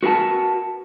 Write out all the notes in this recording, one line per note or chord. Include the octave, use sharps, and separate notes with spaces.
F#4 A#4 B4 F#5 A5